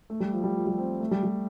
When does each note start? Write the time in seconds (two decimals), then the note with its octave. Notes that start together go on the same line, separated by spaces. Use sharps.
0.10 A3
0.20 G3
0.33 F3
0.44 G3
0.55 F3
0.67 G3
0.78 C4
1.00 A3
1.11 G3
1.23 G3